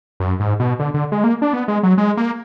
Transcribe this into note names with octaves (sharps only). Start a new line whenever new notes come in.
F#2
G#2
B2
D3
D3
G#3
A#3
D4
B3
G#3
F#3
G#3
A#3